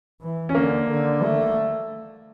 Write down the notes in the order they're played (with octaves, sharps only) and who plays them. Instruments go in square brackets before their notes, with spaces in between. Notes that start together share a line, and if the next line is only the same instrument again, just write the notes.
[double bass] E3
[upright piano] C#4
[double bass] D3 [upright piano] A#3
[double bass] D3
A3